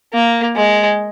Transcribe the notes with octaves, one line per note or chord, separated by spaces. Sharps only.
A#3
G#3